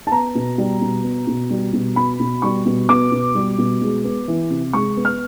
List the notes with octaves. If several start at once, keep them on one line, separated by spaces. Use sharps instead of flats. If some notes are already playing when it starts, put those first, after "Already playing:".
A5
B3 A#5
B2
G3
B2
B3
B2
G3
B2
B3 B5
B2
G3 C#6
B2
B3 D6
B2
G3
B2
G#3
B3
E3
C3
G#3 C#6
B3
F6